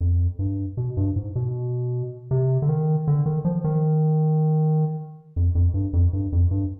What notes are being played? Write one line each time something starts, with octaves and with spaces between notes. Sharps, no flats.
F2
G2
B2
G2
G#2
B2
C3
D3
D#3
D3
D#3
F3
D#3
F2
F2
G2
F2
G2
F2
G2